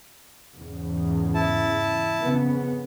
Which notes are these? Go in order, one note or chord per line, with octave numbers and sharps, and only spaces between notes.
E2 G#2 C#3
E4 A5
F2 C#3 B3